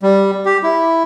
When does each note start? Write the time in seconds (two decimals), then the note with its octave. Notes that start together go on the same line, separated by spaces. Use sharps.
0.03 G3
0.46 G4
0.63 E4